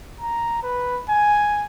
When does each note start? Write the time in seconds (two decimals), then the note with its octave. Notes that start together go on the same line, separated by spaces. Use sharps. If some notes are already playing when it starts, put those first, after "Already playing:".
0.20 A#5
0.63 B4
1.10 G#5